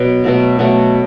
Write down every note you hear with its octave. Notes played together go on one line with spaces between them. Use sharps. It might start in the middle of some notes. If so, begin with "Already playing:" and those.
Already playing: B2 F#3
B2 F#3 A3
B2 F#3 A3